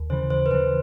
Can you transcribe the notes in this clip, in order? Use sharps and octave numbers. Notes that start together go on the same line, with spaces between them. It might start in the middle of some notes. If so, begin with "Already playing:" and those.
Already playing: D#2
C#3 E3 C5
D#2 C5
B4
C#3 E3 C5